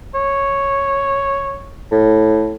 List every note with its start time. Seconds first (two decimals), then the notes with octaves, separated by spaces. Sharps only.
0.15 C#5
1.91 A2